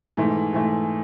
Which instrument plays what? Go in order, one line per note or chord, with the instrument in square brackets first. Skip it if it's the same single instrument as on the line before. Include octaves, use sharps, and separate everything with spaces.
[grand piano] G#2 E3 A3
G#2 E3 A3